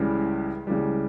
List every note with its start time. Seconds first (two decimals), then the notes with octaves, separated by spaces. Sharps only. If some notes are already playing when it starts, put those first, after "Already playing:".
Already playing: C#2 C#3 E3 G3
0.67 C#2 C#3 E3 G3